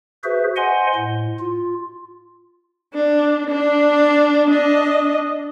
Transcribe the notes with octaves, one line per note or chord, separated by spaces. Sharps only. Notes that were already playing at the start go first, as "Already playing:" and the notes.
F#4 G#4 B4 C5 E5
C5 D#5 F#5 G#5 C6
A2
F4
D4
D4
D4 D#5